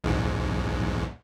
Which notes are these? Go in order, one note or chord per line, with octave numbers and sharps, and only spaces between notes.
B1 E2 G#2